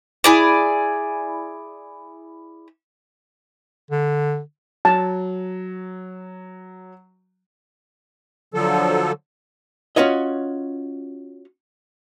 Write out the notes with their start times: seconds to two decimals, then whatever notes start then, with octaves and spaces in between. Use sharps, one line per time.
0.24 E4 G#4 D5
3.91 D3
4.85 F#3 A5
8.54 D3 F3 F#3 A4
9.96 C#4 F4 F#4 C#5 D#5